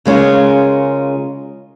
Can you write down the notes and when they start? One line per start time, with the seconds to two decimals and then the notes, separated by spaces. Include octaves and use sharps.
0.06 C#3 G#3 C#4 F4 A#4